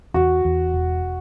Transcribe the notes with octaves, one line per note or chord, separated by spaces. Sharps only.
E2 F#4
E2
E1